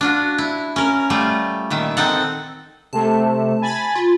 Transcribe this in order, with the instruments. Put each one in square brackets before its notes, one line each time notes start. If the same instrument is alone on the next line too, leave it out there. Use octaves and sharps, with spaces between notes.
[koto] D4 F4 F#4
E4
C#4 A#4
G3 A3 F4
A#2 D#3 E5
C4 D#4 A4 F#5
[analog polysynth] C3 A3 [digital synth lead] A5
[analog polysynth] G#5 B5 A6
[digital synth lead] F4